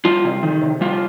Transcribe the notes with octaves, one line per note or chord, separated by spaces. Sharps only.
G3 F4
C3
D#3
C3
G3 F4